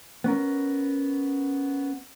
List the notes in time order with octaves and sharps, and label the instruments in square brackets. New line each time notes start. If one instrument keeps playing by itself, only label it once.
[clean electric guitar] B3 C#4 A#4